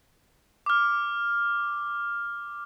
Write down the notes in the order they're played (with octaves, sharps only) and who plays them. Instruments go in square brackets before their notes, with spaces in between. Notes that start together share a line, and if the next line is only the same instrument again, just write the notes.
[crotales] D6 F6